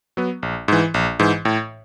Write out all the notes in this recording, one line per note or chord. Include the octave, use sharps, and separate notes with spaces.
F#3 B3
A#1
G#2 E3
A#1
G#2 E3
A2